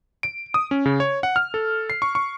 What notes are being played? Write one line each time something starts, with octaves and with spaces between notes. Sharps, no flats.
D7
D#6
C#4
C#3
C#5
F#5
F6
A4
C7
C#6
C#6